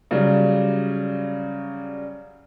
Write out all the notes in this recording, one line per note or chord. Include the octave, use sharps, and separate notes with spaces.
C#3 F#3 G3